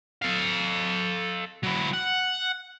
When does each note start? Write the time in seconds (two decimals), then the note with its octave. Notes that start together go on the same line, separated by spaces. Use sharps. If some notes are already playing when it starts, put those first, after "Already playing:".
0.22 A4 F5
1.63 F#3 E4
1.93 F#5